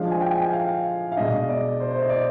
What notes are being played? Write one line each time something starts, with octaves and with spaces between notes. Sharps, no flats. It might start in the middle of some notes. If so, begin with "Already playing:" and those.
Already playing: F3 G#3 D4 F5
G#5
G5
G#5
G5
F5
F5
B2 G#3 D4 D#5
D5
C5
C5
D#5
D5